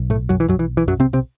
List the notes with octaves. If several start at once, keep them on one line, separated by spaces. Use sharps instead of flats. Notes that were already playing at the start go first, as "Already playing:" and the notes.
Already playing: B1
A2 A3
F#2 F#3
E3
F#2 F#3
E3
E3
F#2 F#3
C3 C4
C3 C4